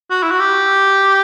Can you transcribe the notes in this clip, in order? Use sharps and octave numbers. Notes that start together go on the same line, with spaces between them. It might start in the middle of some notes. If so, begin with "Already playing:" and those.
F#4
E4
F#4
G4